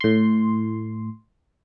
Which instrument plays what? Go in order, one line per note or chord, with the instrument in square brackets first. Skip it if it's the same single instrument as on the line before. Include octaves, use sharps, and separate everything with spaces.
[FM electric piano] A2 C6